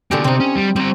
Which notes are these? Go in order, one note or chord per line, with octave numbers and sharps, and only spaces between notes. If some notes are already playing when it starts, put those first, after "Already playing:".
B2 D3 A#3 G4 G#5
C3 C4 D#4 C5
C#4
G3
G3 C4 A#5